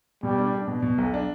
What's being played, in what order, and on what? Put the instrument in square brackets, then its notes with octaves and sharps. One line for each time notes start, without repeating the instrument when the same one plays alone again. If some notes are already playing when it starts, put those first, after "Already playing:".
[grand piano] B2 [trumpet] G3
[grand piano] D4
D4
B2
B2
B1
D4